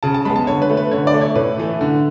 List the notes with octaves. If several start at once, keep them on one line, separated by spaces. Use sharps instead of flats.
C#3 A5
A5
G#3 B3 B5
A5
D3 C#5
B4
A3
B4
D3 C#5
D5
A3
C#5
A2 B4
E3 A3
D3